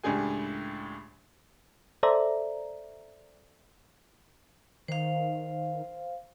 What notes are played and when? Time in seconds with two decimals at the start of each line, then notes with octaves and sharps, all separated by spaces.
0.04 C#2 A2 D4 G4 G#4 G#5
2.03 A4 C5 D5 E5 A#5
4.88 D#3 C5 F5